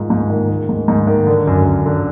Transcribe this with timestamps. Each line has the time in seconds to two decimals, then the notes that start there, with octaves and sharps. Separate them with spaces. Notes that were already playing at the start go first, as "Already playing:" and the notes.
Already playing: G#2 D#3 F4
0.10 G#2
0.30 D#3
0.49 D#3
0.69 G#2
0.88 G#2
1.07 D#3
1.27 D3
1.47 F#2
1.66 F#2
1.86 D3